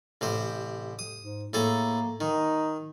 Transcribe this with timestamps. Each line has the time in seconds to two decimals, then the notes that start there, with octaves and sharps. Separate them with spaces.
0.21 A1 C3 C5
0.99 D#6
1.19 G#2
1.53 A2 A#3 G#4 A4
2.21 D#3 D#4